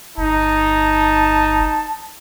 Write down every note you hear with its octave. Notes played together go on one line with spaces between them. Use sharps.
G1 D#4 A5